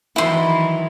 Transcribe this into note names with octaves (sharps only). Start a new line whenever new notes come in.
D#3 E3 F#3 E4 C6